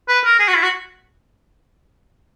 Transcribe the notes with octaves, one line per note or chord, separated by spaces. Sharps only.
B4
A#4
G#4
F#4
E4
F#4